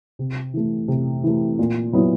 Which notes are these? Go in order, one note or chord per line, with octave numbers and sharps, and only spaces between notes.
C3
E3 A3
C3
E3 A3
A#2
F#3 B3 E4